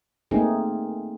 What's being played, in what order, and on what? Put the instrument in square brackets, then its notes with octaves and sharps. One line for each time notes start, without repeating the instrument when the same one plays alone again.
[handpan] A3 A#3 C4 D#4 G#4